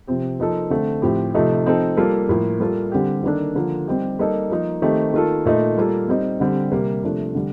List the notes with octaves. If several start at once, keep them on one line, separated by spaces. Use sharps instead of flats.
C3 F3 C4 G4
F3 A#3 D#4 A4
D3 A3 C4
A2 F3 C4 G4
C3 F3 A3 D#4
F3 C4 D#4 A4
G3 A#3 F4 A4
A2 F3 A#3
G3 A#3 F4 A4
D3 G3 C4 G4
D#3 A#3 D4 A4
D3 F3 A#3 F4 A4
G3 C4 D#4 G4
G3 A#3 D#4 A4
F3 A#3 D#4
D#3 A3 C4 D#4 G4
D#3 A#3 F4 A4
A#2 A3 D#4
G3 A#3 F4 A4
G3 C4 D#4
D3 G3 C4 G4
C3 G3 A#3
C3 F3 A3 D4
D3 G3